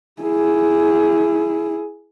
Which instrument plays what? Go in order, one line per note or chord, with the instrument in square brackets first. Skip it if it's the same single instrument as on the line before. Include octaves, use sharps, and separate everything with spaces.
[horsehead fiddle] E4 G#4